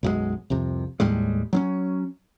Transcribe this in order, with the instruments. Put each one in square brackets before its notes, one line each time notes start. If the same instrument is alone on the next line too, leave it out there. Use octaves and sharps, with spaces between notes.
[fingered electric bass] B1 F#2 E3 G#3
C2 F2 C3
D#2 A2 G3 G#3
F#3 C4 C#4